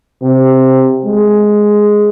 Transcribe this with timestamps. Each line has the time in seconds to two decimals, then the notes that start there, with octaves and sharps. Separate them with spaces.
0.22 C3
1.05 G#3